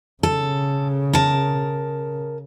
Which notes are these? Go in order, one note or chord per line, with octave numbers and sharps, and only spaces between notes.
C#3 A4
A#4 A5